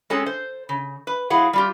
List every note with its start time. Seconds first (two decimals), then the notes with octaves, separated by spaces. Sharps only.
0.10 G#3 C4 C#4 G#4 A4
0.26 C5
0.69 C#3
1.07 B4
1.30 F#3 E4 F4 G#4 F#5
1.53 G3 F4 G4